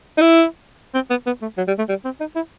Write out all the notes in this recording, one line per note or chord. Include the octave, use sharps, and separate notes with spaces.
D#4
E4
C4
B3
B3
A3
F#3
G3
A3
G3
C4
D#4
E4